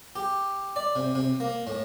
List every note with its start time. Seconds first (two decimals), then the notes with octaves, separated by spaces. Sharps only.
0.16 G4
0.76 D5
0.96 C3
1.15 C3
1.40 A#3
1.67 A2